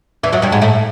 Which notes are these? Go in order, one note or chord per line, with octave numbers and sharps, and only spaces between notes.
E2 E3
F#2 F#3
G2 G3
G#2 G#3
A2 A3